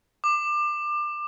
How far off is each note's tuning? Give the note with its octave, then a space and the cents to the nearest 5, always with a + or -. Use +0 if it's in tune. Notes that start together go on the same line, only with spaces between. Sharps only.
D6 +25